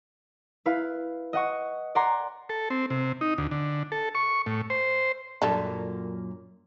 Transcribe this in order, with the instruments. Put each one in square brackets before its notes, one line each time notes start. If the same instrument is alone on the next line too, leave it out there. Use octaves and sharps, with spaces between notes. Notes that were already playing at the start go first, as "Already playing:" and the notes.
[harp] E4 B4 F5
D#5 F#5 C#6
D5 F#5 G#5 A#5 C6
[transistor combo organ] A4
C4
C3
D#4
D2
D3
A4
C#6
A2
C5
[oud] F#2 A#2 [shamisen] D4 A4